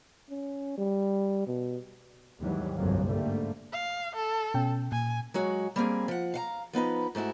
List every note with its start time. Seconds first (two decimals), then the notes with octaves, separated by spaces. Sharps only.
0.30 C#4
0.78 G3
1.47 B2
2.40 D#2 G#2 D#3 E3 F#3 G3
2.77 G1 C2 F2 F3 F#3 A#3
3.07 G#2 D3 G3 A3 A#3
3.72 F5
4.16 A4
4.54 B2 C#4 G5
4.92 A#2 G#5
5.34 F#3 G#3 F#4
5.76 G3 A#3 C4 G#4
6.08 F3 F#5
6.34 F5 F#5 A#5
6.73 F3 B3 D#4 B4
7.15 G#2 A3 E4 F#4